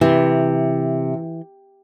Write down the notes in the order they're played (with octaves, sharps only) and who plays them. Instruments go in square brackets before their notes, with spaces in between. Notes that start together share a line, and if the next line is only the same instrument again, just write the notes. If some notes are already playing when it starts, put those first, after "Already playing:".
[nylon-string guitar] C3 [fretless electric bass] E3